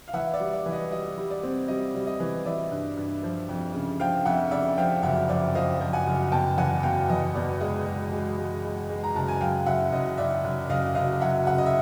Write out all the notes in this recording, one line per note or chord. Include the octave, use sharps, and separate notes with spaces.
F5
E3 E5 F#5
D5 E5
G3
D5
E3
D#5
G3 D#5
G3
D5
C4
G3 D#5
G3
D#5
E3
E3 D5 E5
G2
G2
F3
F2
C#3
F3 F5 G5
F2 E5 F#5
C#3 D5 E5
F3 F5 G5
F#1 E5 F#5
F3 D5 E5
F3 D#5 F5
F3
F#5 G#5
F#1
B2 G5 A5
E2 F#5 G#5
B2 F5 G5
E2 D#5
B2 D5
G#3 D#5
G#3
G#3
G#3
G#3
G#3
A#5
F#1 A5
G#5
F#3 F5 G5
F#1 E5 F#5
F#1 D#5
F#1 D5 E5
F#1
F#1 D#5 F5
F#1 D#5 F5
F#3 E5 F#5
C#3 E5 F#5
D#5
E5